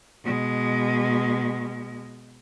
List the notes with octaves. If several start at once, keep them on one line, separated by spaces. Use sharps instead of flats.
B2 G#3